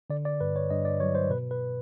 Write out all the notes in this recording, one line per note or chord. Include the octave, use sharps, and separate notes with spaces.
D3 D5
D5
G2 B4
C#5
G2 D#5
D5
F#3 C#5
C5
B2 B4
B4